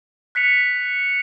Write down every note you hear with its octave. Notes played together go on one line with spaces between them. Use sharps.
F#6 B6 C#7 F7